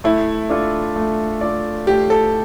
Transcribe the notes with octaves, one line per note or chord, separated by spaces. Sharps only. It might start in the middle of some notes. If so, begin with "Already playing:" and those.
A3 E4
D4 F4 A4 D5
A3
D4 F4 A4 D5
A3 G4
A4